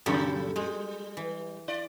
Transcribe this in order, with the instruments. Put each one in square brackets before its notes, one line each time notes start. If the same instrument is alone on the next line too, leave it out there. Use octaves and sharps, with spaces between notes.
[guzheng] F#2 A#2 G3 [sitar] C#3 F#3 A4
[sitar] G3 [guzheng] G#3
[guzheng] E3
[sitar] E4 D5